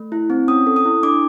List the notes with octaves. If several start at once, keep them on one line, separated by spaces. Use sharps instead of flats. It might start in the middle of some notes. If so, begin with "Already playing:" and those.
Already playing: A3
E4
C4
C#4 D#6
A4
D#6
E4
D4 D6